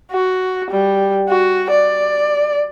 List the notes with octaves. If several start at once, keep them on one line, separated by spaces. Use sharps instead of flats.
F#4
G3
F#4
D5